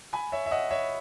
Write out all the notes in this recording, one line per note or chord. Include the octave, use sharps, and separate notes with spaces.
G#5 B5
C#5 E5
E5
D#5 F#5
C#5 E5